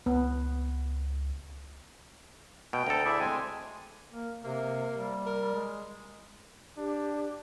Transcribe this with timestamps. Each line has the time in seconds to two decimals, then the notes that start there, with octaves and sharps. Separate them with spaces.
0.06 C#2 B3
2.73 B2 G5
2.86 D2 A4 A#5
3.05 E4 G#4 D5 E5
3.20 G#3 C4 G#5
4.12 A#3
4.44 C3 A#3
4.97 G3
5.26 A#4
5.55 G#3
6.77 D4 G4